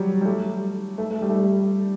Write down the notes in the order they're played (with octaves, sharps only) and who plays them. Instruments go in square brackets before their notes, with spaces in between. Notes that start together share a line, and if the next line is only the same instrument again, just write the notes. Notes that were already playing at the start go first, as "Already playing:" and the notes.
Already playing: [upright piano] F#3 G3
G3
A3
A3
A3
G3
A3
G3